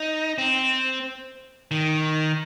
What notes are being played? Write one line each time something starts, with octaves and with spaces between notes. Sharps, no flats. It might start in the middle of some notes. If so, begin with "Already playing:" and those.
Already playing: D#4
C4
D#3